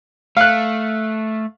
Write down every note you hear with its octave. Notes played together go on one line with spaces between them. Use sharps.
A3 F5 F#6